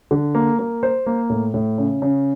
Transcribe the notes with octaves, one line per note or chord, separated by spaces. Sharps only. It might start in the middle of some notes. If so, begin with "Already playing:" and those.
D3
A#3
A#3
C5
A#3
A2
A2
C#3
C#3